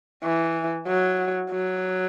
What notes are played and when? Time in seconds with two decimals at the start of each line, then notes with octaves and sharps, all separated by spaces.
0.23 E3
0.88 F#3
1.51 F#3